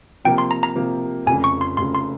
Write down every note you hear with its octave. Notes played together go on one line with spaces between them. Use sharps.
C3 F3 A#3 G5
C6
A#5
A#5
C3 F3 A#3
F1 F2 C#3 G#5
C#6
C6
F1 F2 C#3 C6
C6